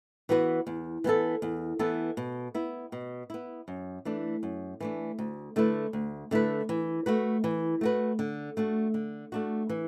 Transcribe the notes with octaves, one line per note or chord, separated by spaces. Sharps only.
E3 B3 F#4 B4
E2
E3 B3 E4 A4
E2
E3 B3 E4 A4
B2
B3 E4
B2
B3 E4
F#2
E3 A3 D4
F#2
E3 A3 D4
D2
D3 A3 E4 B4
D2
D3 A3 E4 B4
E3
A3 F#4 B4
E3
A3 F#4 B4
D3
A3 D4 F#4
D3
A3 D4 F#4
E3